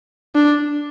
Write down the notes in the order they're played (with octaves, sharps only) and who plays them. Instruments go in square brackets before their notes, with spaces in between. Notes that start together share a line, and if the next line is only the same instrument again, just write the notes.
[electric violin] D4